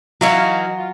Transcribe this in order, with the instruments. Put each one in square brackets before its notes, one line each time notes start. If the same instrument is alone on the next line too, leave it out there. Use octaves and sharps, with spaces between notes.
[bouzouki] E3 D#4 F#4 [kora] F#3 [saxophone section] F5
[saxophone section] F4